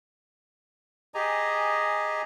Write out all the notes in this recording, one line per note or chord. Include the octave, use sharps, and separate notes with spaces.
G4 G#4 D#5 G#5 A#5